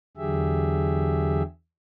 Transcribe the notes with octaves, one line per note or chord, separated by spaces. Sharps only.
E2 D3 F#3 G4 G#4 E5